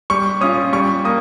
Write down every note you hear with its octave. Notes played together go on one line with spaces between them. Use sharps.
G3 C#6
C#4 F4 D#6
G3 C#6
A#3 D#6